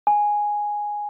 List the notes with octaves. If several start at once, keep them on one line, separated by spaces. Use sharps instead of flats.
G#5